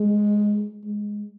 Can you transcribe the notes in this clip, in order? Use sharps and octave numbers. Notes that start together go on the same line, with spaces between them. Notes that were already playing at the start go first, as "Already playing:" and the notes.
Already playing: G#3
G#3